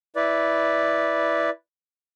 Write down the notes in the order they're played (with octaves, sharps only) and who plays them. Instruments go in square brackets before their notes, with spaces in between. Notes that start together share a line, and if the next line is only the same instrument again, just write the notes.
[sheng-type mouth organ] E4 B4 D5